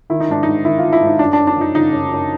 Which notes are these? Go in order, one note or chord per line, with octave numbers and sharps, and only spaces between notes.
D#3 E4
D#4
G#2 D4
G#2 D#4
D#3 E4
F4
D#3
E4
G#2
D#4
F#2 D4
F#2 D4
D4
F3
D#4
C#3 D#4
F#2
F#2